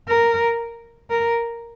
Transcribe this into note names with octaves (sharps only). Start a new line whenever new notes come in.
A#4
A#4